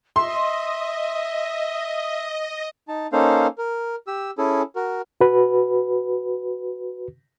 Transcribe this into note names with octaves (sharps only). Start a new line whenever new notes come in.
D#5 E5 C6
D#4 A5
A#3 C#4 D#4 A4 C5 F5
A#4
G4 E6
C#4 E4 G#4 A4
F#4 A#4
F#4 B4